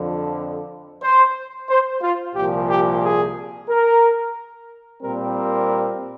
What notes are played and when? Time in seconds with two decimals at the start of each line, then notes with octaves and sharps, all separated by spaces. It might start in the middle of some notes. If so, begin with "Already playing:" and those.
Already playing: F2 D3 F3
1.02 C5
1.69 C5
2.02 F4
2.36 C2 A#2 F3 G4
2.70 G4
3.02 G#4
3.69 A#4
5.03 A#2 G3 C4 A#4
5.36 A#4